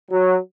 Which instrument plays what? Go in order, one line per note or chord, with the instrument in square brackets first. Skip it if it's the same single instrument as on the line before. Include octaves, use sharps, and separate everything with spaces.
[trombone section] F#3